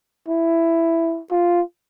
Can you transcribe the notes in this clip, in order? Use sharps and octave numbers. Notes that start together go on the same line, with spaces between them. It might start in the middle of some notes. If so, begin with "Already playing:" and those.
E4
F4